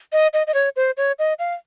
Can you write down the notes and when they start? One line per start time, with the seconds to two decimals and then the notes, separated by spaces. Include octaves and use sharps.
0.13 D#5
0.34 D#5
0.47 D#5
0.54 C#5
0.76 C5
0.97 C#5
1.19 D#5
1.39 F5